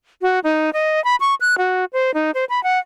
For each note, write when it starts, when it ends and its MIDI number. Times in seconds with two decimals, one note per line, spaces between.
0.22 0.40 66
0.44 0.70 63
0.73 1.02 75
1.04 1.16 83
1.20 1.34 85
1.40 1.55 90
1.58 1.85 66
1.93 2.14 72
2.14 2.31 63
2.34 2.45 72
2.49 2.62 83
2.63 2.79 78